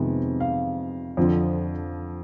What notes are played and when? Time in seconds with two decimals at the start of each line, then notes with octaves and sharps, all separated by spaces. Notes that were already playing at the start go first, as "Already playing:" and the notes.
Already playing: F2 C3 D#3 G#3 B3
0.40 F5
1.17 F2 D3 F3